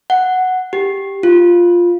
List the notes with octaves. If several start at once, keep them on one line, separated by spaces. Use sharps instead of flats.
F#5
G4
F4